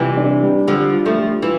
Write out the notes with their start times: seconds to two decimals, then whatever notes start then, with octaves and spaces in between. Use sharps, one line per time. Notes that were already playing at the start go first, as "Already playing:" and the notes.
Already playing: C3 E3 G3 F4
0.17 D4
0.43 G3
0.67 D3 F3 G3
0.93 F4
1.05 F3 A3
1.18 G3
1.42 E3 F4